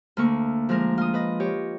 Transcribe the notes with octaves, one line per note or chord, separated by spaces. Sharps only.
D2 A3 A#3 C#6
F3 G#3 D4 A#4
F4 D#6
B4 D#5
G4 C#5